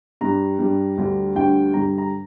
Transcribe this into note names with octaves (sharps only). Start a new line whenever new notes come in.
G2 G3 A#5
G2 G3
D2 D3 G3
D2 D3 G3 G5
G2 D3 G3 A#5
A#5